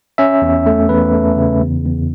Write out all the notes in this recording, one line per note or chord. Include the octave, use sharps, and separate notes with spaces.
C#4 E5
E2
A3
E2 B4
A3
C#3
E2
E2